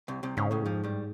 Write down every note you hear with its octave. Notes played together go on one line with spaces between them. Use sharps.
C2 C3
C2 C3
C#2 G#2 C#3
C#2 A2 C#3
F2 G#2 F3
G2 G3